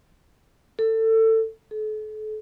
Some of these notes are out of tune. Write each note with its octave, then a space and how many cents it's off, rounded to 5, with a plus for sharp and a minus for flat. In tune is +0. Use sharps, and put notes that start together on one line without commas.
A4 +25
A4 -40